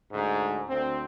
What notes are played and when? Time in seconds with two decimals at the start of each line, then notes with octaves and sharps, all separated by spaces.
0.12 D2 G#2
0.69 D2 C4